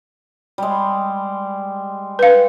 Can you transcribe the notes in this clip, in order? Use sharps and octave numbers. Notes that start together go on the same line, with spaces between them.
G3 G#3
B4 F5